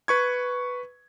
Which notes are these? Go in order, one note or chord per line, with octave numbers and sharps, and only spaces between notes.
B4 C#6 G#6